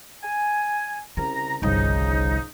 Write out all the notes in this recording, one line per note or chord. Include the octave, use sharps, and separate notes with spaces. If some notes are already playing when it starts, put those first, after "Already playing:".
G#5
C2 C#3 A#5
G1 C2 C#3 F3 D#4